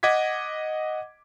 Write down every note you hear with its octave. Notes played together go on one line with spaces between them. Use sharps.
D#5 F#5 D6 G#6 B6